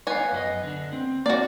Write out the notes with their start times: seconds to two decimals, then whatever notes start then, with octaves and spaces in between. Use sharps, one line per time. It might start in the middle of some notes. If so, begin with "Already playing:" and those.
0.07 B3 C#5 F5 G#5
0.32 F#2 F#4 D#5
0.63 D3 D4
0.93 C4
1.26 A#3 F#4 D5